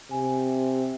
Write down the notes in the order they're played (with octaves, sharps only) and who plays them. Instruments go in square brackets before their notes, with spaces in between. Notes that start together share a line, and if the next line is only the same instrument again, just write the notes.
[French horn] C3 [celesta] G#5